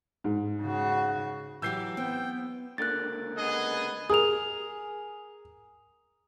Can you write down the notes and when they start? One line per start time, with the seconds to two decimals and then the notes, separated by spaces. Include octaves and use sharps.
0.24 G#2
0.62 C#3 F#4
1.62 E3 F#3 G4 E6 G6 C7
1.97 B3 C4 G5
2.78 C#2 D3 A#3 F#6 A6
3.38 B3 G#4 D#5
4.10 G#4 A#4 D#6 F7